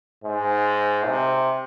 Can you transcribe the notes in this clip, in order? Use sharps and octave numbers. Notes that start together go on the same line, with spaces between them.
G#2
C3